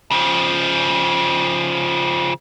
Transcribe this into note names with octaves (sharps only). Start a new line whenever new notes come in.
C#3 F3